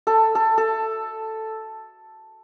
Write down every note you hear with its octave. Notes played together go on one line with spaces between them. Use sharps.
A4
A4
A4